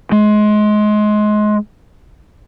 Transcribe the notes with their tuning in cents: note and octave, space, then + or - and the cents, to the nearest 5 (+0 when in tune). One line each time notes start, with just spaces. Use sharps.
G#3 +25